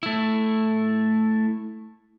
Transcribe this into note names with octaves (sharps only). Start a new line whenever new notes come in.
A3 E4